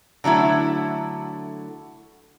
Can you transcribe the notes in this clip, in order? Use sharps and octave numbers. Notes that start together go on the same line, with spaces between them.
D3 F#3 A3 E4